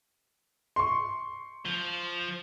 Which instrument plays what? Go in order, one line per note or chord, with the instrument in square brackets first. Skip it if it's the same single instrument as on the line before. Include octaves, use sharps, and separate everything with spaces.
[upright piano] C6 C#6
[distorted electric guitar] F3